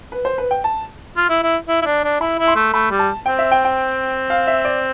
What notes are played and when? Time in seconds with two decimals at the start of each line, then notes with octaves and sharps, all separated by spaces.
0.12 B4
0.25 C5
0.38 B4
0.51 G5
0.64 A5
1.17 F4
1.29 E4
1.43 E4
1.68 E4
1.82 E4
1.86 D4
2.04 D4
2.21 E4 B5
2.39 E4
2.47 C6
2.56 A3
2.73 A3 B5
2.91 G3
2.99 A5
3.26 C4 G5
3.39 E5
3.52 G5
3.65 G5
4.30 F5
4.47 E5
4.65 D5